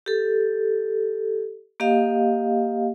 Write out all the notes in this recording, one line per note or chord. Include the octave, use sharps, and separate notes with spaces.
G4 A4
A#3 G4 D#5 F5